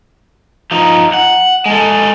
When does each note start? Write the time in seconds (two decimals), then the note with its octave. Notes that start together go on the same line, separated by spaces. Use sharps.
0.71 F3 D#4
1.14 F#5
1.66 G#3 A4